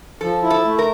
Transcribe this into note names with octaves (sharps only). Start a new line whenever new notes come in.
F3 A4
E4
A4
A3
A#4